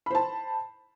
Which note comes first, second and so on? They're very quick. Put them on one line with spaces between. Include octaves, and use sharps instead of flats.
B5 C5 A5